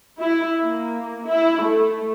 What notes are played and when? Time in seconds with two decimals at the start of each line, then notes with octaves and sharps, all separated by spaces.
0.20 E4
0.63 A#3
1.27 E4
1.62 A3